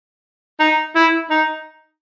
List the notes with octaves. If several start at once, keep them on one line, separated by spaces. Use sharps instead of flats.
D#4
E4
D#4